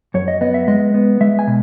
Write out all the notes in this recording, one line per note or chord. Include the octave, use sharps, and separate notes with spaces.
F#2 C#5
D#5
B3 D#5
E5
G#3 D#5
B3
G#3 E5
G#5
B2